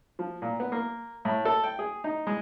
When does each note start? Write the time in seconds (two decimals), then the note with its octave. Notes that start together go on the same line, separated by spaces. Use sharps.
0.19 F3
0.42 A#2
0.60 B3
0.72 A#3
1.25 A2
1.45 A4
1.64 G5
1.79 G#4
2.04 D#4
2.27 G#3